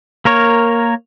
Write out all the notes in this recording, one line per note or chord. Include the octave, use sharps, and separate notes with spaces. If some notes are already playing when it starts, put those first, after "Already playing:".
A#3 A#4 C#5